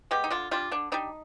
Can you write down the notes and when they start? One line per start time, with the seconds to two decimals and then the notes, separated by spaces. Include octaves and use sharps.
0.11 G#3 B3 G4
0.24 D#4
0.30 D3 F4
0.51 G3 D4 F4
0.71 D3 D4
0.92 G3 D4 D#4